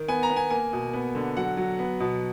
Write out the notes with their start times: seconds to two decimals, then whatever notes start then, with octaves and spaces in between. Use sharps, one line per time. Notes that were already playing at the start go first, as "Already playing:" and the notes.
Already playing: D#3
0.08 B3 G#5
0.23 A#5
0.30 B3
0.36 G#5
0.50 A#3 G#5
0.73 B2
0.93 B3
1.15 D3
1.37 F#3 F#5
1.57 F#3
1.79 B3
2.00 B2